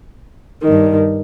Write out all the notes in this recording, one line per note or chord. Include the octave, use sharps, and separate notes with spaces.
G2 D#3